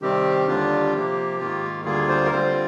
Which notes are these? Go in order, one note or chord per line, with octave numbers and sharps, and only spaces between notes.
C3 D#3 G3 C4 G4
D#2 D3 G3 D4 F4
C3 F3 A#3
G#2 D#3 A#3 F4
D2 D3 G3 A#3 F4 G#4
C5
A#4
D3 G3 C4 F4 C5